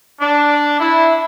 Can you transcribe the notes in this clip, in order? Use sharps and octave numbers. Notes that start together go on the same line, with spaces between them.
D4
E4